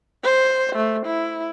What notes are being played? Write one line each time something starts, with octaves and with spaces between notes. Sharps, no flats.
C5
A3
E4